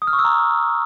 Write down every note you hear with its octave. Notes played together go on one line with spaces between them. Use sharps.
D#6
F6
C#6
E6
A#5